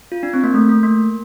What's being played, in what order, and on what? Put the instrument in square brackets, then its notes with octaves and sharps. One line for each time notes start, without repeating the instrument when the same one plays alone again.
[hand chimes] F4
D4
C4
A#3
A3
A3
A#3